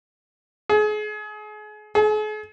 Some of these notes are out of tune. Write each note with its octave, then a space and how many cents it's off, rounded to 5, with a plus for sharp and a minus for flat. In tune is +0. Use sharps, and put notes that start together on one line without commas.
G#4 +35
G#4 +45